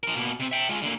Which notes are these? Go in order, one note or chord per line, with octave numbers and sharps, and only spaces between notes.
F3 A#4
B2 A#3
C3 C4
E5 G5
G#3 F4
D3 A#3